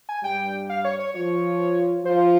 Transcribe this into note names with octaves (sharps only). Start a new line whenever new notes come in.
G#5
G2 G3 G5
F5
C#5
C#5
F3 F4 C#5
F3 F4 C5